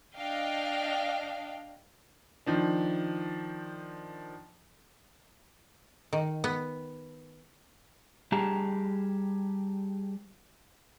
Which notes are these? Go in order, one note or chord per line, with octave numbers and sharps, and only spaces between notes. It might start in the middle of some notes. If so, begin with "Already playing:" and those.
D4 D#5 F5 G5
D#3 F3 D4
D#3
B3
G3 G4 G#4 A5 A#5